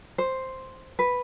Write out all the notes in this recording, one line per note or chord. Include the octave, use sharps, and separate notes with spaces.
C5
B4